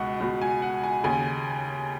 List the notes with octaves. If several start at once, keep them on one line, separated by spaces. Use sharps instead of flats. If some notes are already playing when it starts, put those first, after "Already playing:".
Already playing: C#2 B2 F#5 C#6
C#2 B2
G#5
F#5
G#5
D#2 C#3 G#5